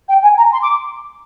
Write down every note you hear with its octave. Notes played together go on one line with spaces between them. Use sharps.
G5
G#5
A#5
C6
D6